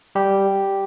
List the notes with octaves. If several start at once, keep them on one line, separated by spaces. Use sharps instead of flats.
G3 G4